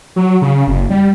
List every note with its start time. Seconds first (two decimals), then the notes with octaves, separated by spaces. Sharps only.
0.16 F#3
0.42 C#3
0.67 F#1
0.90 G3